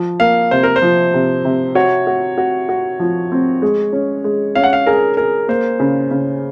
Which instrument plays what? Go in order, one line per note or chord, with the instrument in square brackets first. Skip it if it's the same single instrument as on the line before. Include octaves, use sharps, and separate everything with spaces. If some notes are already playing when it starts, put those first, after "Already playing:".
Already playing: [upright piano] F3
[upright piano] A#3 [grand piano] F5
[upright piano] C3 [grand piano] C5
[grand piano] A#4
C5
[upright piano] F3
C3
C3
[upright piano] F#4 [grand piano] C#5
[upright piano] F#4
F#4
F#4
F3
C4
G#3
C#4
G#3
[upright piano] C#4 [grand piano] F5
[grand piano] F#5
F5
[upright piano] G#4 [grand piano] A#4
[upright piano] G#4 [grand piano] A#4
[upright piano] A#3 [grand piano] C5
[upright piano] C#3
C#3